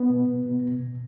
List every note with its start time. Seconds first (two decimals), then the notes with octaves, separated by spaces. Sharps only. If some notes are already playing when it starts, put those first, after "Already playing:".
Already playing: B3
0.10 B2
0.28 B2
0.46 B2
0.63 B2
0.81 B2